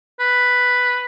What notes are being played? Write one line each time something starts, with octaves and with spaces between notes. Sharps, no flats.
B4